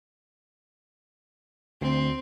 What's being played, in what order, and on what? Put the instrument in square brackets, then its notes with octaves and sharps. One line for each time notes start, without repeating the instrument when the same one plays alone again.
[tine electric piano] D2 [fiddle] C4